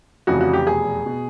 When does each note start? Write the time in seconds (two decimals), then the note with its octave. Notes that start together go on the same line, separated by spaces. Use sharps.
0.27 F1 F2 C#3 E3 F#4
0.41 F#4
0.53 G4
0.66 F1 E2 B2 G#4
1.06 B2